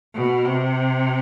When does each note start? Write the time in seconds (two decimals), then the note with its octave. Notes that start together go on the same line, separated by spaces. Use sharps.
0.14 B2
0.44 C3